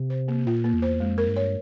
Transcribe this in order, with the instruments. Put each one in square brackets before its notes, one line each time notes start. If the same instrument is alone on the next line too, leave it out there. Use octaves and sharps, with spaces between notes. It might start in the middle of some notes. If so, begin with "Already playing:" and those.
Already playing: [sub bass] C3
[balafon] C5
A#3
[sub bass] A#2 [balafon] F4
[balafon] A#3
[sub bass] E2
[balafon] C5
[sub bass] F2 [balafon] G#3
[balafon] A#4
[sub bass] G2
[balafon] C#5